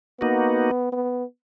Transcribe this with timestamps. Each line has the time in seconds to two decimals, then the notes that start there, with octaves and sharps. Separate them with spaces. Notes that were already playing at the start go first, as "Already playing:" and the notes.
0.20 A#3 B3 D#4 F#4
0.92 B3